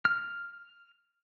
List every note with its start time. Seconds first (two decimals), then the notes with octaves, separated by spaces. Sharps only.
0.05 F6